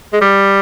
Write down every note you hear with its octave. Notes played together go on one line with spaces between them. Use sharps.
G#3
G3